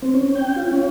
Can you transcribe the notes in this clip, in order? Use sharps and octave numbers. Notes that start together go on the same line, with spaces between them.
C4
C#4
G5
F4
C#4